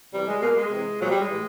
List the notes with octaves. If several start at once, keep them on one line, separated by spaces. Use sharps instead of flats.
C3 E3 G3
G#3
B2 A#3
G#3
C3 E3
A#2 F3 F#3
G3
G#3
A2 E3